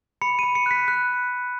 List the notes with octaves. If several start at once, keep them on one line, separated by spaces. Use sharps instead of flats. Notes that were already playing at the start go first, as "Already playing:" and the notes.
B5 C#7
B5 D#7
C#7
F#6 B6
F#6